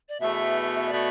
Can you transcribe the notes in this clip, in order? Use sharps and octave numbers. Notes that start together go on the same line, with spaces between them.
D5
E2 B2 A3 E5
E5
B2 A3 D5